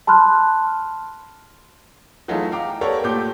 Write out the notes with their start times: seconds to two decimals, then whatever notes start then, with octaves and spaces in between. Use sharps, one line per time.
0.07 A5 B5 C6 F6 F#6
2.28 E3 F#3 A3 D#4 F4 G#4
2.52 F5 G5 A#5 D6
2.81 B3 G4 A4 A#4 C#5 D5
3.04 A#2 A3 G4 D6 G6